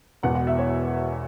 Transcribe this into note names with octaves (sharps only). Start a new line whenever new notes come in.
E1 E2 B2 F#5
F#5
E5
C#5